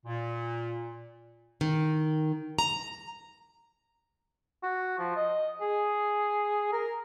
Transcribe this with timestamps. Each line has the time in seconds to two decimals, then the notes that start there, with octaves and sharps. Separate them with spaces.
0.05 A#2
1.61 D#3
2.59 A#5
4.63 F#4
4.99 F3
5.16 D#5
5.61 G#4
6.73 A#4